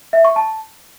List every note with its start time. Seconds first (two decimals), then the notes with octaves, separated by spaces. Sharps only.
0.13 E5
0.25 C#6
0.36 A5